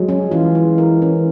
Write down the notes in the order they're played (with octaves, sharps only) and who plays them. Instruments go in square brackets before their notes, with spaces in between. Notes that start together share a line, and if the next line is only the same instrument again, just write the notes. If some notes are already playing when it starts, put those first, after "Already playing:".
Already playing: [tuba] F#3 [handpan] G#3
[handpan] C#4
[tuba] E3 [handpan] F4
[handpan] G#3
A#4
C#4